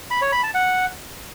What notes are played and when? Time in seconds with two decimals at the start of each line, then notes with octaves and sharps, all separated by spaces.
0.11 B5
0.21 C#5
0.32 B5
0.43 A5
0.54 F#5